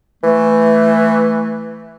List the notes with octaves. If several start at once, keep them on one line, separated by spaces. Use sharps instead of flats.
E3 A3